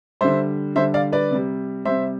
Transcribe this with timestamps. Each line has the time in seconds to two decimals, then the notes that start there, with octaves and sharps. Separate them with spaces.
0.21 D3 G3 C5 E5
0.76 D3 G3 C5 E5
0.94 D5 F5
1.12 B4 D5
1.31 C3 G3
1.85 C3 G3 C5 E5